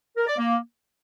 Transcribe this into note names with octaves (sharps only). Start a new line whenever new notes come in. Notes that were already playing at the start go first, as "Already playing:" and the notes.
A#4
D5
A#3